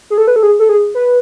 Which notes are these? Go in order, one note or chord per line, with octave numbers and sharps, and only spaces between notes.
G#4
A4
B4
A4
G#4
A4
G#4
B4